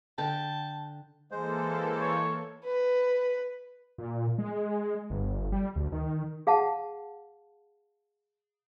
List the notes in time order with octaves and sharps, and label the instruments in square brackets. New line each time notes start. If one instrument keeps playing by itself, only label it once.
[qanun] D3 [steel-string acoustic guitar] G5 [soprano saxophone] A5
[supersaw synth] E3 A#3 A4 [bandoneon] G#3 C5
[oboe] C#5
[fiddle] B4
[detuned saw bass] A#2
G#3
G1
G3
D2
D#3
[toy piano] G#4 F5 F#5 A5